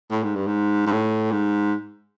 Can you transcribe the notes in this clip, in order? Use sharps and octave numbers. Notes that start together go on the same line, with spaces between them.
A2
G#2
G2
G#2
G#2
A2
G#2